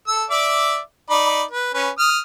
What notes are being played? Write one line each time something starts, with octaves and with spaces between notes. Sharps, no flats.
A4 E6
D5 E5 D6
D#4 D5 B5
B4
C#4 B4
D#6 F6